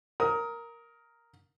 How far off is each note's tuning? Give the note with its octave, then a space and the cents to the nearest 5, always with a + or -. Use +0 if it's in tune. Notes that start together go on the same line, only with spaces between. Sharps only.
A#4 +0 D#6 +25